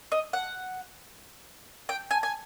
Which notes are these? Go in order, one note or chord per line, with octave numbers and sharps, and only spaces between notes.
D#5
F#5
G5
G#5
G#5